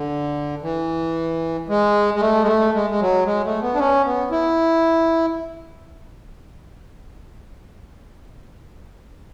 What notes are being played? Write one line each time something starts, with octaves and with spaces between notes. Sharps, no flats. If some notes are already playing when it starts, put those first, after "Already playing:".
Already playing: D3
E3
G#3
G#3
A3
G#3
A3
G#3
G#3
F#3
G#3
A3
B3
D4
C#4
B3
E4